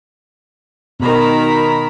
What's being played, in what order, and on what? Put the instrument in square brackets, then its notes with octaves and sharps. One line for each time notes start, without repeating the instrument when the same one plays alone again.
[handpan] B2 [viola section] D#3 A#5 B5